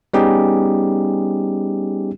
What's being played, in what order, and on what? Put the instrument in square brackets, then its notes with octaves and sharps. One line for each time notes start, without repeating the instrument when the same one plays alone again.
[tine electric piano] G3 B3 C#4 D#4 G4 G#4